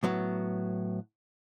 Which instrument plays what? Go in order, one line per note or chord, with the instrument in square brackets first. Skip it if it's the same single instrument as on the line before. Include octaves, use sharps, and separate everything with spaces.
[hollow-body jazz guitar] A2 F#3 B3